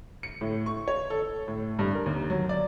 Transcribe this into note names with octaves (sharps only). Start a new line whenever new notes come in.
C#7
A2
C#6
C#5
A4
A2
G2
A#4
D#2
F#3
D5